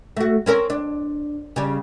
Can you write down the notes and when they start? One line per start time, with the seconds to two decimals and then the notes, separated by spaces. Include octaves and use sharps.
0.17 A3 F#4
0.46 C4 C#4 A#4
0.70 D4
1.56 C#3 G3